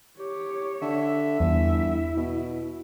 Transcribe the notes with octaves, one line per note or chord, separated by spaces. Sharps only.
G4 C#5
D3 E5
G1 E2 E4
B2